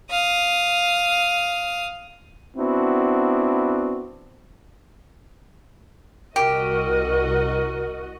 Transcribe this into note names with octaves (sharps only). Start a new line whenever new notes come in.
F5 D#6
B3 C4 D4 E4 F#4
C2 F#4 G4 A#4 D#5